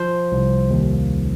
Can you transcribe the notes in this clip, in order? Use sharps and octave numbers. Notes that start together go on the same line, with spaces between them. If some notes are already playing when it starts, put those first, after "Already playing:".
Already playing: F3 C5
C2
D#2